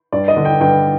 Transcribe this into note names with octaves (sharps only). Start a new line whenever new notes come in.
G2 D5
D#5
D3
G5
G2 G5